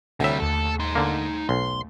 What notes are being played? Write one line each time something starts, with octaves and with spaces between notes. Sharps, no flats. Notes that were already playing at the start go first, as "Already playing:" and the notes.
D2 C3 G3 C#5 E5 F#5
D#2 A3 A4
D#4 C6
D3 A#3
B1 C6